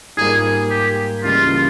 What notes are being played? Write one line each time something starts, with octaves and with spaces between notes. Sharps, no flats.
G#2 G3 A#3 F4 G#4 A#4
G4
C#2 C#3 E3 G3 A#3 F4